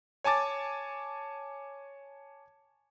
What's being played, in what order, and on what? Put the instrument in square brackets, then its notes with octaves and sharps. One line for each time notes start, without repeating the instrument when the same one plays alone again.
[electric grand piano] C#5 G#5 A5 D6 A6